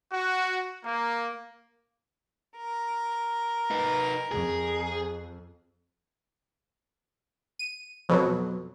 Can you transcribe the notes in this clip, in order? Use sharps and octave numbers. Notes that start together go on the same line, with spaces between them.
F#4
A#3
A#4
D#4 B4
F2 G#4
D#7
F2 B2 F#3